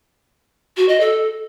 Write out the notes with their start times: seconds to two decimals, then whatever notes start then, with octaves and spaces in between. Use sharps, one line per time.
0.77 F#4
0.89 D#5
1.00 A4